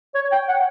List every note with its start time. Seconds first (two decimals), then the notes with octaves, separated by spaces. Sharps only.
0.15 C#5
0.32 G5
0.48 F#5